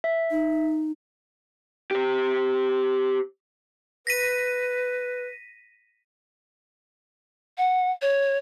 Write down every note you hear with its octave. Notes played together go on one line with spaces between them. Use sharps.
E5
D#4
G4 C5
B4 A#6 B6 D#7
F#5
C#5